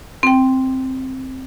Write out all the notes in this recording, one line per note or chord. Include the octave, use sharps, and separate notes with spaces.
C4 G5